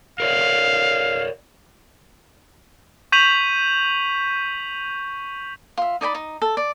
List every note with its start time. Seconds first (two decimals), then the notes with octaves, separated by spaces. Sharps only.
0.20 A#4 C#5 D5 F5
3.12 C#6 G6 B6 D#7 F7 F#7
5.77 F4 E5
6.01 D#4 D5 G#5 B5
6.14 D#4
6.42 A4
6.57 D5